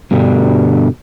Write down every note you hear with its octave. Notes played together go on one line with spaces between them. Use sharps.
G2 B2 D3 G3